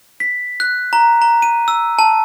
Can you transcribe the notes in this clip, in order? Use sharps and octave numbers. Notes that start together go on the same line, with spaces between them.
B6
F#6
A#5
A#5
D#7
E6
A5